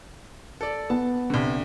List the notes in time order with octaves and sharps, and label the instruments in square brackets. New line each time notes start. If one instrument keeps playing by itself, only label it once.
[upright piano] A4 D5
[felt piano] B3 [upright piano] A5
[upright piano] C2 D3